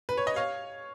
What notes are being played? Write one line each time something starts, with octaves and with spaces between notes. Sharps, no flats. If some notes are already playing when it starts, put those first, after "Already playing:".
B4
C#5
D#5
C#5 F5